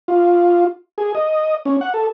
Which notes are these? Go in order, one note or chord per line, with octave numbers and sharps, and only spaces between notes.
F4
G#4
D#5
C#4
F#5
A4